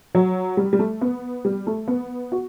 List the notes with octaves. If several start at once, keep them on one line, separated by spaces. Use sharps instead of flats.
F#3
G3
G3
A3
B3
G3
A3
B3
F#4